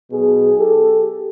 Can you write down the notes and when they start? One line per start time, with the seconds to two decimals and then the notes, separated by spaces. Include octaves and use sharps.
0.12 B1 B2 G#4
0.58 G4 A4